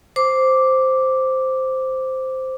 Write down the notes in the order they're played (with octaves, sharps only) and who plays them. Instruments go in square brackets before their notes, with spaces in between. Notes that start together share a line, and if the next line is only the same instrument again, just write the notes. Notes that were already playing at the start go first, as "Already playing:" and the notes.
[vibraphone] C5 D6